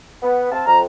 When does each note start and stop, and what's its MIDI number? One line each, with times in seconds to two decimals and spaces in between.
0.22 0.50 59
0.51 0.64 60
0.51 0.64 77
0.51 0.64 81
0.66 0.86 41
0.66 0.79 82